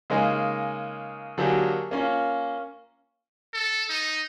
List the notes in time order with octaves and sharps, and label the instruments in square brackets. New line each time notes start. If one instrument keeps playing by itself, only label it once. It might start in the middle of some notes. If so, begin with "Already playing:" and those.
[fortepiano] C#3 G#3 A#3 D#4 G#4
D3 F#3 A#3 G4 G#4
A#3 C#4 F4
[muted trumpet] A4
D#4